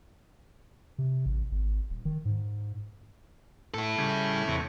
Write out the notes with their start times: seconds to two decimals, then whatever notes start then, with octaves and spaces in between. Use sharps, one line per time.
0.98 C3
1.26 A1
1.52 G#1
1.90 D#1
2.05 D#3
2.25 G#2
3.74 A2 E4 A4
3.98 C#3 G3 G#5
4.48 E2 C3 C#5